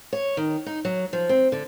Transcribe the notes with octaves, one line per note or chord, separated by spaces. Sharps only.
C#5
D#3
D#4
F#3
F3
C4
D3